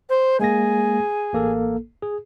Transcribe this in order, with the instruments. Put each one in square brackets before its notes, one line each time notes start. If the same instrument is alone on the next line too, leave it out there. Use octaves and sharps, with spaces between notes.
[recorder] C5
[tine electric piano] G#3 A#3 A#6 [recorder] G#4
[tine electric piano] A1 A#3 A4
G#4